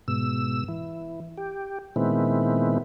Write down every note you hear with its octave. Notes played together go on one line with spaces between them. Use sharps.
G#2 B2 E6
E3
G4
A#2 D#3 G#3 B3 C4 E4